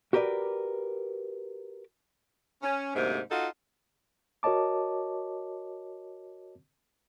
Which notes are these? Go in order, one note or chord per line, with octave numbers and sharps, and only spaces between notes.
F#4 G4 A#4 B4 D5
C#4
D2 G#2 C3 A#3
D#4 F4 F#4 A4
F#4 A#4 C#5 D#5 A5 D6